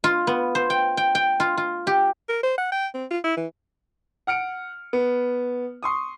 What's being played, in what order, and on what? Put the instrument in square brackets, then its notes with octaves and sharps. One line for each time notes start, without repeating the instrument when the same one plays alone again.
[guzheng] F4
B3
C5
G5
G5
G5
F4
F4
G4
[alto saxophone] A#4
C5
F#5
G5
C4
F4
E4
E3
[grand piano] F#5 F6 C#7 D7
B3
C6 C#6 D#6